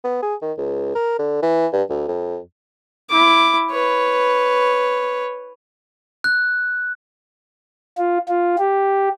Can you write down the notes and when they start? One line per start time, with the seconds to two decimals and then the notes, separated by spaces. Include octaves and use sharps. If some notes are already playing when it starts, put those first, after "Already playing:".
0.04 B3
0.22 G#4
0.42 D#3
0.58 C#2
0.95 A#4
1.19 D3
1.43 E3
1.73 G2
1.90 D2
2.08 F2
3.10 E4 D6
3.71 B4 C#5
6.24 F#6
7.98 F4
8.29 F4
8.58 G4